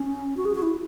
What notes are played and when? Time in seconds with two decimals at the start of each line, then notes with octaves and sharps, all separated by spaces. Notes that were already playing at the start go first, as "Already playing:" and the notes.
Already playing: C#4
0.37 F#4
0.45 G#4
0.55 F#4
0.62 E4